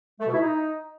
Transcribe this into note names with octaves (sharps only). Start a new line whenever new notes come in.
A3
B2
E4
D#4